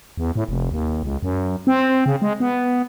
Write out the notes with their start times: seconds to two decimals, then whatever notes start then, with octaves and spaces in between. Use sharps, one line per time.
0.17 E2
0.36 A2
0.49 F1
0.71 D#2
1.03 C#2
1.23 F#2
1.67 C4
2.06 C#3
2.22 G#3
2.40 B3